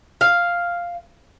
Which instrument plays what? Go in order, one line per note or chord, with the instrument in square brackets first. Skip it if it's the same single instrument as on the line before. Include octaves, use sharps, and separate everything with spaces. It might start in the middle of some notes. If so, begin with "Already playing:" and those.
[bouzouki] F5